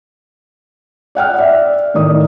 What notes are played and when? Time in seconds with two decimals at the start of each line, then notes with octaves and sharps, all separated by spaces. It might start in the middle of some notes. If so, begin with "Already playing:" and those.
1.15 D5 F#5 G5 F6
1.39 D5 E5
1.94 A2 D#3 D5 D#6